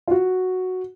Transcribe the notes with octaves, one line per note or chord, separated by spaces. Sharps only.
F4
F#4